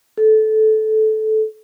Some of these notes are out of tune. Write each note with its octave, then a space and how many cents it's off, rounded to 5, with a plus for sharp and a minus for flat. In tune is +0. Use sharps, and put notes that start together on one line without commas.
A4 -15